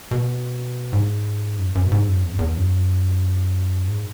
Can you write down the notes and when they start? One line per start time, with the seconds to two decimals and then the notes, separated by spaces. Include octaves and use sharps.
0.11 B2
0.93 G#2
1.58 F#2
1.75 F#2
1.87 B2
1.92 G#2
2.07 F#2
2.24 E2
2.31 F#2
2.39 E2
2.57 F#2
3.88 G#2